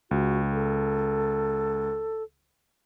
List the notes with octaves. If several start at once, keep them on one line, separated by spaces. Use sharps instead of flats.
C#2 F#4
A4